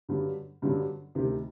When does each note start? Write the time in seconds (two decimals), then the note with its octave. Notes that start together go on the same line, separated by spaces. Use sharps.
0.09 G2 D3 F#3
0.62 G2 D3 F#3
1.15 D2 C3 D#3